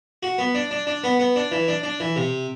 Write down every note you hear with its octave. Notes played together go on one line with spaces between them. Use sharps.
F#4
B3
D4
D4
D4
B3
B3
D4
E3
D4
D4
E3
C3